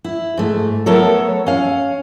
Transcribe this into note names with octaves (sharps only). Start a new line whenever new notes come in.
E4
G#2 A3
F#3 A3 B3 A4 A#4 C#5
C#4 F5